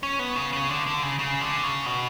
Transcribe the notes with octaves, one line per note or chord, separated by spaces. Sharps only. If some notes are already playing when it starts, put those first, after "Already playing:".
C#4
B3
C#3
C#3
D3
D3
C#3
C#3
D3
C#3
B2